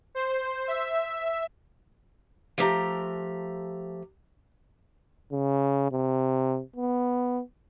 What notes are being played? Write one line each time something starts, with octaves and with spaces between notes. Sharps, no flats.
C5
E5
F3 A3 G4 A#5
C#3
C3
B3